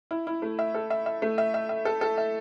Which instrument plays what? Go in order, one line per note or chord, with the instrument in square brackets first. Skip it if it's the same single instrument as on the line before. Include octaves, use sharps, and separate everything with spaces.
[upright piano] E4
E4
A3
E5
A4
E5
E5
A3
E5
E5
E5
A4
A4
E5